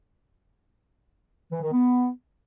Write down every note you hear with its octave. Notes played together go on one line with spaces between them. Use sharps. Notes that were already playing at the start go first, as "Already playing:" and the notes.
E3
D#3
B3